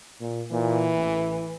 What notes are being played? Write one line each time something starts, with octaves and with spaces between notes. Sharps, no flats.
A#2
A#2 E3
A1